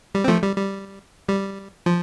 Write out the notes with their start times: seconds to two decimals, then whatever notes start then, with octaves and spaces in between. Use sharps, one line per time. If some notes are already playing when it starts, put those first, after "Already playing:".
0.15 G3
0.24 C4
0.28 F3 A3
0.43 G3
0.56 G3
1.29 G3
1.86 F3